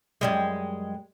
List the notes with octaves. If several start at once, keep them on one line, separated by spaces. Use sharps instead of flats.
F#2 G3 G#3